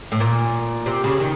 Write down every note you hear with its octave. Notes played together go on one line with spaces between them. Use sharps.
A2
A#2
C3
C#3
D#3